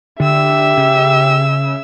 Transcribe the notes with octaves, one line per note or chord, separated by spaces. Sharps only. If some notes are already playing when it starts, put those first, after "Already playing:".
D3 G4 E5 E6
C#3